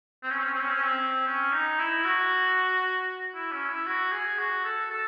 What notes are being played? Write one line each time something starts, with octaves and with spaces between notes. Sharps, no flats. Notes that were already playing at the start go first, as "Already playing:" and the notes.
C4
C#4
C4
C#4
C4
C#4
C4
C#4
C4
C#4
D#4
E4
F#4
E4
C#4
E4
F#4
G#4
F#4
A4
A4